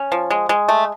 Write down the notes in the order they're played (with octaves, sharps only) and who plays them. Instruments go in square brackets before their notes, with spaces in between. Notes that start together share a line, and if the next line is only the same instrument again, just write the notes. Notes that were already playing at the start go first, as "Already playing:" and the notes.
Already playing: [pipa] C#4
F3
G#3
G#3
A3